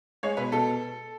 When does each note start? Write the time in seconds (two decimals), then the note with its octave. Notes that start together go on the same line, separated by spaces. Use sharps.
0.23 G#3 C#5
0.37 B2 B4
0.52 B2 A4